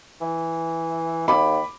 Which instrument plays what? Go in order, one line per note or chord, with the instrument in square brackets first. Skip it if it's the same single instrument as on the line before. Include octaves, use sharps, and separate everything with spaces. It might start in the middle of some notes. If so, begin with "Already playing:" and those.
[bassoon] E3
[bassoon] D#2 [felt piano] B5 D6